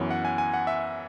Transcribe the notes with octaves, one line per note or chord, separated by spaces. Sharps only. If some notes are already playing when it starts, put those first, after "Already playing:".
Already playing: F#2 E3 B3 C#5
F#5
G#5
G#5
F#5
E5